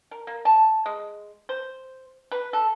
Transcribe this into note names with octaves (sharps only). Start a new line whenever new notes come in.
A#4
A#3
A5
G#3
C5
B4
A4